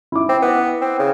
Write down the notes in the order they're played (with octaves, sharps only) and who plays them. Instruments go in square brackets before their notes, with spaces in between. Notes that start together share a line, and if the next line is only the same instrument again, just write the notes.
[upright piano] E4 D6
[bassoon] C4
B3
C4
C#3